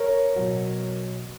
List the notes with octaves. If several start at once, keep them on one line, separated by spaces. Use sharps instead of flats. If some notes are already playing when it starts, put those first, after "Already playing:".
Already playing: A#4 C#5
B2 F#3